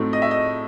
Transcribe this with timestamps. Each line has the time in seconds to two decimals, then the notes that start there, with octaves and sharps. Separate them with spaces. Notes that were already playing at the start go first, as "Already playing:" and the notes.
Already playing: A2 F#3 A3 C4 D#4
0.13 D#5
0.22 E5
0.31 D#5